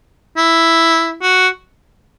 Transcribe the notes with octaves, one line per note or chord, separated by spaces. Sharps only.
E4
F#4